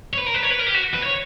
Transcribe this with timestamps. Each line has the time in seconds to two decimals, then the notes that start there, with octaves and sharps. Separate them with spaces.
0.13 C#5
0.18 B4
0.26 A#4
0.34 B4
0.43 C#5
0.50 B4
0.59 A#4
0.67 G4
0.74 F#4
0.94 B4
1.04 C#5